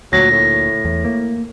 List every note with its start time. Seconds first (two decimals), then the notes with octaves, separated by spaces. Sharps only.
0.13 D2 A#2 F#3 A#6
0.31 A2
0.85 E2
1.05 A#3